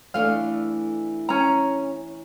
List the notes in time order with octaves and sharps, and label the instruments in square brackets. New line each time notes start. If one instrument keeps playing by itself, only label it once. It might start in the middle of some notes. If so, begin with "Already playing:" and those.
[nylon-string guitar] E3 A3 D4 [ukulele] F5
[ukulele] C#4 A#5